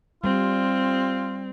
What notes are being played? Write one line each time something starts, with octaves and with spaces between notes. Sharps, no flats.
G3 C4 F4